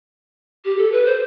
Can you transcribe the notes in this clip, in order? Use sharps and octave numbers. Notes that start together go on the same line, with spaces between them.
G4
A4
B4
C5